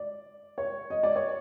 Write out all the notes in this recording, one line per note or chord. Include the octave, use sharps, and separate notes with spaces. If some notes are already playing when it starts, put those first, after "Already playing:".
Already playing: D5
C#5
D#5
D5
C#5